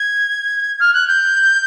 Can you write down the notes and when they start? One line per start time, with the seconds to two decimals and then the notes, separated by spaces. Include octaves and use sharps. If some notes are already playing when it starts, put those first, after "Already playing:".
Already playing: G#6
0.80 F6
0.93 F#6
1.08 G6